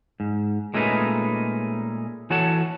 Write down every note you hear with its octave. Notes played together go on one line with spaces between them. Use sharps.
G#2
A#2 G#3 A3 C#4 D#4 B4
E3 F#4 A4 C#5 F#5 A5